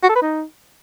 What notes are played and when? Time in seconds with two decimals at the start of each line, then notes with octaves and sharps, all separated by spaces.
0.03 F#4
0.10 A4
0.16 B4
0.22 D#4